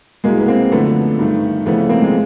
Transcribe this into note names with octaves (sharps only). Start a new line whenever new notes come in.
C2 B2 G#3 A#3
B3
A#3 C4
F#2 D3 F3 A3 B3
G2 D#3
F2 C#3 E3 A3 B3
A#3 C4
G#3